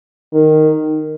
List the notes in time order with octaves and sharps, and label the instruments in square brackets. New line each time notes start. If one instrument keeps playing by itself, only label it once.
[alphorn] D#3